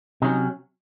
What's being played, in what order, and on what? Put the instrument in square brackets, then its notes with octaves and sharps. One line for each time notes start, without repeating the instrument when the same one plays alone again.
[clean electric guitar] C3 F#3 C#4 D#4